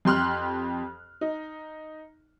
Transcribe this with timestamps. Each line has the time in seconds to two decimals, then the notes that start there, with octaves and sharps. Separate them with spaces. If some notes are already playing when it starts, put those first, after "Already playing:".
0.05 F2 G4 C6 F6 F#6
1.21 D#4